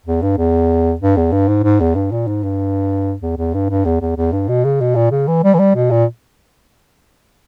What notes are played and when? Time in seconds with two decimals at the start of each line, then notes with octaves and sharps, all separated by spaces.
0.06 E2
0.22 G2
0.37 E2
1.01 G2
1.17 E2
1.32 G2
1.48 G#2
1.63 G#2
1.80 E2
1.95 G2
2.12 A#2
2.27 G#2
2.43 G2
3.22 E2
3.37 E2
3.54 G2
3.70 G2
3.85 E2
4.01 E2
4.16 E2
4.32 G2
4.49 B2
4.65 C#3
4.81 B2
4.95 A#2
5.11 C#3
5.28 E3
5.44 G3
5.54 E3
5.59 G3
5.75 B2
5.91 A#2